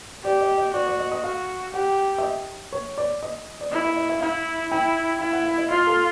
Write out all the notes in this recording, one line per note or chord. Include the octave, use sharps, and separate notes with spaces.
G4 D5
D#5
D#5
F#4 D5
D5
D#5
D#5
F#4 F5
G4 F#5
E5
D#5
C#5
D5
D#5
D5
E4 D#5
E5
D#5
E5
E4 F5
E4 G5
E4 F5
F#5
F5
D#5
F4 D#5
A4